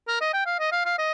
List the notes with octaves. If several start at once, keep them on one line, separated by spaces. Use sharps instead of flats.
A#4
D#5
G5
F5
D#5
F5
F5
D#5